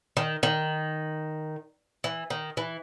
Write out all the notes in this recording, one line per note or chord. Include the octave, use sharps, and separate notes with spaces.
D#3
D#3
E3
D#3
E3